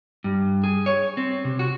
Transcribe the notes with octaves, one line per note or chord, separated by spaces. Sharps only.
G2
G#4
C#5
C4
C3
F#4